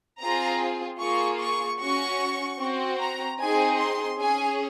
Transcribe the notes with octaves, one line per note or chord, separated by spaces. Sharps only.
C4 F4 G#4 A#5
A#3 F4 G#4 C#6
C#6
C#4 F#4 C#6
C4 F#4
A#5
C4 D#4 G#4 G#5
C6
C#4 G#4 G#5